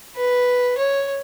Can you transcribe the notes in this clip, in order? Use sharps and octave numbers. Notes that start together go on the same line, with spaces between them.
B4
C#5